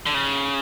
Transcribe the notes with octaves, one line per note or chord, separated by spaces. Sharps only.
D3
C#3